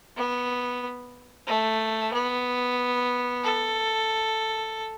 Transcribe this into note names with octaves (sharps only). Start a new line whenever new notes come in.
B3
A3
B3
A4